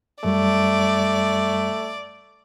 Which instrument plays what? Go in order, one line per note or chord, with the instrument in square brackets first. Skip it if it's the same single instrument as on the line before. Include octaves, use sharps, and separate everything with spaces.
[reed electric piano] F#2 G3 [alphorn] A3 [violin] D5